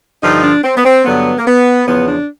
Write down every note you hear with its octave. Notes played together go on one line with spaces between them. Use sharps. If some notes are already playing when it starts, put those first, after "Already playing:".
G2 D3 F3 D#4
D4
C4
B3
C4
G2 D3 F#3 B3
A#3
B3
E2 C#3 F3 B3
D4